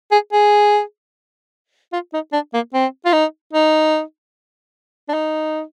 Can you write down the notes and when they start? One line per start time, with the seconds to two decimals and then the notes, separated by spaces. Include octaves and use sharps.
0.12 G#4
0.33 G#4
1.93 F4
2.14 D#4
2.33 D4
2.54 A#3
2.74 C4
3.06 F4
3.13 D#4
3.53 D#4
5.09 D4
5.14 D#4